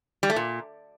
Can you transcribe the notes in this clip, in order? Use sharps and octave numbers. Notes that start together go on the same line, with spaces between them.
G3
A3
A#2